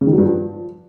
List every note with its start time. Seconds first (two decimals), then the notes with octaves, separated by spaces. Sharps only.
0.01 C#3
0.07 D#3
0.12 F#3
0.18 G2
0.24 F3